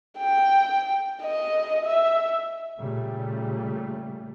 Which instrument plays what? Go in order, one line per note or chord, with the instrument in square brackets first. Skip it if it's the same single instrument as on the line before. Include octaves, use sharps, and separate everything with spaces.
[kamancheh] G5
D#5
E5
[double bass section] A#2 C#3 G3 A3